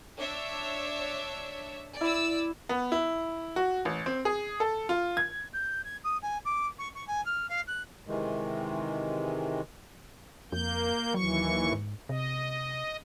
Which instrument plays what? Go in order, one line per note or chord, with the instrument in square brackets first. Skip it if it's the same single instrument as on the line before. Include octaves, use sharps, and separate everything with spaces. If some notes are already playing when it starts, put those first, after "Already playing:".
[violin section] D4 C#5 E5
[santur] E4 [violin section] D5 E6
[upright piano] B3
E4
F#4
A1
C4
G#4
A4
F4
G#6
[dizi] G6
G#6
D#6
G#5
D6
C#6
C#6
G#5
F6
F5
F#6
[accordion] C3 D#3 E3 G#3
[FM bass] F2 [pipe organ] A#3 G6
[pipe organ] D#2 E3 C#6 [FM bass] F#3
[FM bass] G#2
[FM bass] C3 [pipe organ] D#5